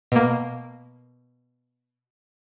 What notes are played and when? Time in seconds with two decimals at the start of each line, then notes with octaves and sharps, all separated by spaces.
0.12 B2 A#3